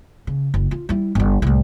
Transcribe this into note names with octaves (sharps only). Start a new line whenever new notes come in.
C#3
F#1
F4
G3 E4
G1 D3
C2 A2